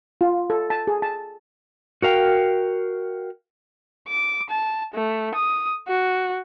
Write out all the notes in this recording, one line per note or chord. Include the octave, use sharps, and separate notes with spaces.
F4
A4
A5
G#4
A5
F#4 A#4 F5 G5
D6
A5
A3
D#6
F#4